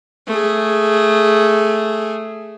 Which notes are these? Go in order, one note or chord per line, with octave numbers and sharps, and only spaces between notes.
A3 G#4